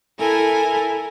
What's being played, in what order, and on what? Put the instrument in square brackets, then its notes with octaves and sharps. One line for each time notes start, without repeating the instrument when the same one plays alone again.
[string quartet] E4 A4 A#4 G#5